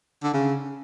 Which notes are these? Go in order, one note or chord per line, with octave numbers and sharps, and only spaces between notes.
D3
C#3